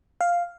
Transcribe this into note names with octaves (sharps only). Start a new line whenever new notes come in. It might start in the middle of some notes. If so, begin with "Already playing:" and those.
F5